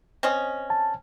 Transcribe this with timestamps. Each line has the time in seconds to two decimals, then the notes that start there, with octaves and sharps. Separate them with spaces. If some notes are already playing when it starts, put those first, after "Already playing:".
0.23 C4 C#4 D#5
0.70 A5